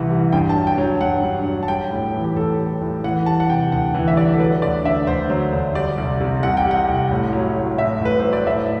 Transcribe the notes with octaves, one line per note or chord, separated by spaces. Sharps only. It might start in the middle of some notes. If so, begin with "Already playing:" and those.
Already playing: C2 C3 E3 E5 F#5
G3
G2 G5
A5
F#3
G5
F#3
G5
G2 F#5
G2
F#3
A5
G3 G5
A2
E3
G4
A2 A4
G3
A2
E3 F#5
G3 A5
F#5
C3 G5
D2 F#5
E3
E5
G3 D5
A4
F#3 B4
D2 D5
D3 E5
D2 C5
F#3
D2
G3 D5
C2
C3
C2 F#5
G5
G3
F#5
C2
A2
F#3
F#3
A2 E5
A2 B4
F#3 C5
D5
A2 E5